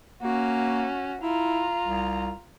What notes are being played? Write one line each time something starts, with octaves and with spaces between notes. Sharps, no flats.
A#3 C#4 F#4
E4 F4 A#5
C2